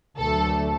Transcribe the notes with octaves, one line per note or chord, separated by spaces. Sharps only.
D2 D3 F#3 A3 A4